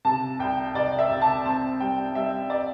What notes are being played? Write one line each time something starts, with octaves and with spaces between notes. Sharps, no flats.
C3 A5
C2 G5
C2 D5
E5
C3
A5
C4 A5
G3 G5
G3 E5
D5